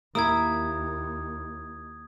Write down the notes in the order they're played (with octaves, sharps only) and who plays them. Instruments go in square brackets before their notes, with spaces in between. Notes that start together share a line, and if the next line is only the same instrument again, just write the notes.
[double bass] D#2 [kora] A#3 E4 [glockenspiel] D#6 G#6